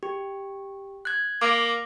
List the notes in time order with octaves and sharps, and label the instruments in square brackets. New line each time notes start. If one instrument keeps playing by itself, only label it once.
[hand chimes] G4
F#6 G#6
[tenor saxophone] A#3 [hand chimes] D6 A#6